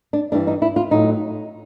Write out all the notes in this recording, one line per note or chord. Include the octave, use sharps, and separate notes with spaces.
D4
G2 E3 G3 D4
D#4
E4
F4
A2 F#3 D#4